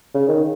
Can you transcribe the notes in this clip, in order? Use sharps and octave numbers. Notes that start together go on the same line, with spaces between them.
C#3
D#3